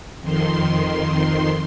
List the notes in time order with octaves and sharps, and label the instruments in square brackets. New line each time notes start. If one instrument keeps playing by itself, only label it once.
[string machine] F2 D#3 C6